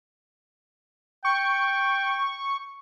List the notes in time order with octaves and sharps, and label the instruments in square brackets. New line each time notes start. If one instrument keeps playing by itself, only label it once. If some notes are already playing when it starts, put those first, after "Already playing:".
[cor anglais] G5 [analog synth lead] C#6